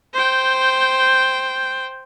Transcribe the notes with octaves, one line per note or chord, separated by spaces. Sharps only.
C5 G5